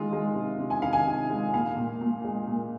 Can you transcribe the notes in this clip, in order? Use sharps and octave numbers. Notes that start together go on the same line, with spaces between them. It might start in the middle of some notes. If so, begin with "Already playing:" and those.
Already playing: D#3 G#3 F4
G#3
C3
C3
G#5
D#3 F5
G#5
C3
G#3
A#2 F5
A#2
A#2
G#3
A#2